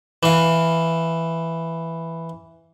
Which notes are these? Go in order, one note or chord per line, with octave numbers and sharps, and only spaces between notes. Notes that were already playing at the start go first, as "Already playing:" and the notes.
E3 F5